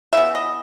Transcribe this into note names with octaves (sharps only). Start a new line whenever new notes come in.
C#3 E3 B3 E5
D#5